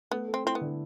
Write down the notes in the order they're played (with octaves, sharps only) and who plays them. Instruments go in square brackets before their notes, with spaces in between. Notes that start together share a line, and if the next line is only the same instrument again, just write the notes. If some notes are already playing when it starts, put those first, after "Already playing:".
[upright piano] A3 [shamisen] B3
[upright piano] A4
[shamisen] C4
[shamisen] C4 [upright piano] E4
[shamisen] B3
[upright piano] D3